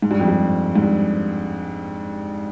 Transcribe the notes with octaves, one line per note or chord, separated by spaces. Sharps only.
G#2
G2
F2
G2
G#2
G2